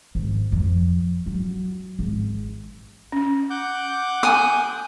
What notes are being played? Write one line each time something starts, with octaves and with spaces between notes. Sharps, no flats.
G#1
F2
F#3
G#1
C#4
F#5 D6 G6
G#5 D#6